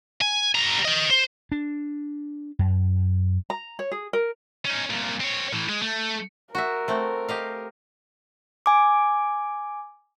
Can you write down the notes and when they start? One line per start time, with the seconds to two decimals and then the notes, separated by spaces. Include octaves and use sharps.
0.22 G#5
0.55 G3 A#5
0.85 D#5 G5
1.11 C5
1.52 D4
2.59 F#2
3.50 A#5
3.79 C#5
3.91 G#4
4.13 A#4
4.65 C#4 D#4
4.90 C2 A#2
5.20 C4 C#5
5.53 A2 E3
5.69 G#3
5.82 A3
6.55 F#4 A#4 E5
6.88 A3 C4
7.29 G4 D#5 F5
8.66 G#5 D6